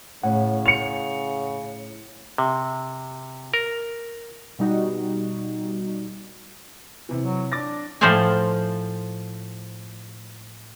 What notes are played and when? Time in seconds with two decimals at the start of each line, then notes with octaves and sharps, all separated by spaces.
0.23 A2 C#3 F#5
0.66 C#7 F7
2.38 C3
3.54 A#4
4.59 B2 G3 D#4 F#4
7.09 C3 E3
7.22 F#3
7.52 D4 D6 A6 A#6
8.01 A2 F3 C5 D5 F5 G#5